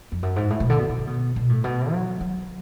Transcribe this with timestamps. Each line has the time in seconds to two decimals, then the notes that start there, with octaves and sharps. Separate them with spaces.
0.12 F2
0.23 F#2
0.36 G#2
0.50 A2
0.60 B2
0.70 D3
0.79 B2
0.89 B2
0.98 C#3
1.07 B2
1.36 B2
1.49 A2
1.64 B2
1.92 F#3
2.20 F#3